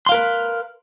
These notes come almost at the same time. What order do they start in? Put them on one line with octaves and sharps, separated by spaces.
C6 F5 A#4 B4